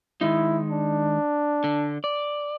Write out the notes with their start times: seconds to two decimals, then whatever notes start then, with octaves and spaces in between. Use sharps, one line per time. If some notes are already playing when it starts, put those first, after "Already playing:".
0.21 D#3 G#3 D#4 E4
0.71 D4
1.64 D3
2.04 D5